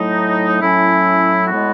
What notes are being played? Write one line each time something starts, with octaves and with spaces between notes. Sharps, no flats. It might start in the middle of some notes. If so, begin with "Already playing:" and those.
Already playing: A2 F#3 A3 D#4
A2 F#3 C#4 E4
A2 G#3 B3 F#4